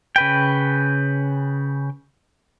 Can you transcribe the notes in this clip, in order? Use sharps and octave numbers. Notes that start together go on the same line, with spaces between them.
C#3 B4 G5